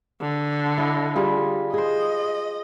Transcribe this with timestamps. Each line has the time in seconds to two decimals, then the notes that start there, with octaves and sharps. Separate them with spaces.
0.21 D3
0.78 E4 D#5
1.15 G3 F4 G#4
1.74 G#4 C5 D#5